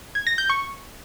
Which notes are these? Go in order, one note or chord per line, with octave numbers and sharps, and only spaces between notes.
G#6
A#6
G6
C#6